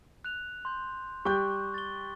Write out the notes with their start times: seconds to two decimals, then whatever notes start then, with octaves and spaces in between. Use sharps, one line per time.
0.25 F#6 F7
0.65 C6 G6
1.25 G3 G5 C#6 D6 F#6 G6
1.74 A6 G7